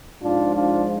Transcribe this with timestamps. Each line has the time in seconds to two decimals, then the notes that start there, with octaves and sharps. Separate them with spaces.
0.21 G#2 F3 D4 F4
0.54 D4 F4